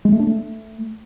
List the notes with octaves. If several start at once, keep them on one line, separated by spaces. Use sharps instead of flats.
G#3
A3
D4
A3